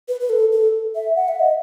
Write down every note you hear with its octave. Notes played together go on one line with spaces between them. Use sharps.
B4
B4
A4
A4
E5
F#5
E5
D#5